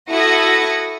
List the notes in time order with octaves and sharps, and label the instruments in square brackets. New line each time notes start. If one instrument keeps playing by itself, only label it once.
[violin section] E4 F#4 A4 D#6 A#6 C#7